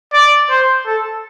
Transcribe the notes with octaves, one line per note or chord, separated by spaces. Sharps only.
D5
C5
A4